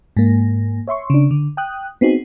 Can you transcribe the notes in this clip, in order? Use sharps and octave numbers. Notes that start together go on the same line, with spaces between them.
G#2 A#3
C#5 E5 C6 C#6
C#3 D4
D3
G5 D#6 F#6
B3 C4 D#4 F#4 G#4